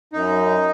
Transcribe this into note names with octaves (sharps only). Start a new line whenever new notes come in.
F#2 D#4